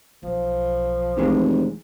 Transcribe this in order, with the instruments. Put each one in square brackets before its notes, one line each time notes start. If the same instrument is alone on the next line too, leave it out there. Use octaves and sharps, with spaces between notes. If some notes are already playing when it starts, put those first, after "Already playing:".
[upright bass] B1 [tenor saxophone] F3
[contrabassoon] F1 [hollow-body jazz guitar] E2 E3 G#3